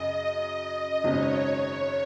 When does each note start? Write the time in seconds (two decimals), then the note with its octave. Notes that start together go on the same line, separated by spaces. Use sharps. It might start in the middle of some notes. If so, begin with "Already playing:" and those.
Already playing: F#2 C#3 D#5
1.04 G#1 F#2 C#3 C#5